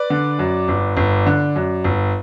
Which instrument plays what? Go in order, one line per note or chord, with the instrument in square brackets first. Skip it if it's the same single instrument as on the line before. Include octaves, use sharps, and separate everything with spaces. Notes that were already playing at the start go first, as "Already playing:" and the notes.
Already playing: [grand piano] B4 D5
D3
F#2
G1
G1
D3
F#2
G1